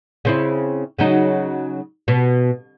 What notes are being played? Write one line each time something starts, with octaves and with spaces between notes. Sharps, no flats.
C#3 C4 E4
C#3 F#3 D#4
B2